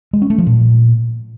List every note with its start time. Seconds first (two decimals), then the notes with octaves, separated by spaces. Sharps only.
0.13 G#3
0.22 C#4
0.30 A3
0.38 F3
0.47 A#2